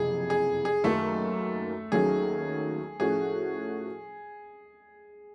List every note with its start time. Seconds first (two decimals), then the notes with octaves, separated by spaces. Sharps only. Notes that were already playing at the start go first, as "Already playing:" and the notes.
Already playing: F#1 F2 C3 E3 G#4
0.30 G#4
0.65 G#4
0.84 F#2 D#3 F#3 A3 A#3 D#4 A4
1.92 D#2 D#3 F#3 A3 C#4 G#4
3.00 A2 F3 A3 C#4 F#4 G#4